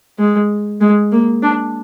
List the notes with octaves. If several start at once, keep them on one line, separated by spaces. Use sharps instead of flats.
G#3
G#3
A#3
D4